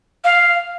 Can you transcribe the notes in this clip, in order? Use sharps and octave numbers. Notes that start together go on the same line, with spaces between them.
F5